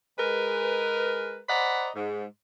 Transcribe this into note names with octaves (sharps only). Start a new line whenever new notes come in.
G#3 A#4 B4
C5 D5 D#5 F#5 A#5 B5
G#2